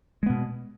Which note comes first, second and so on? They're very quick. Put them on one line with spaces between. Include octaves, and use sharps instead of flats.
G#3 B3 B2